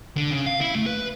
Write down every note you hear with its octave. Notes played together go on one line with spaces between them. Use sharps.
D3
C#3
F5
E4
A3
B4